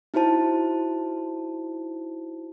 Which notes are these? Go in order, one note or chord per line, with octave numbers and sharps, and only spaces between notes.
D#4 E4 F#4 C5 A5